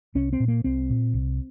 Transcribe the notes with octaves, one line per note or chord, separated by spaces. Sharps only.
C2 C#4
C4
A#2
A#3
C2 C4
A#2
C2